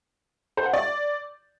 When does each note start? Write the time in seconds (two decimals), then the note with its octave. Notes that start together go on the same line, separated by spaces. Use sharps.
0.57 C5
0.65 F#5
0.73 D5